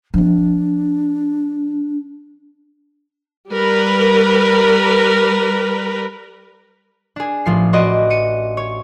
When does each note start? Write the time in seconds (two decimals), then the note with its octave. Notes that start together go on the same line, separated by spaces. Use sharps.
0.14 F3 C4 D4
3.51 G3 A#4 B4
7.16 D4 G#4
7.46 A1 F3 C7
7.73 F#4 B4 C5 D5 D#5
8.10 C#7 D#7
8.57 C#5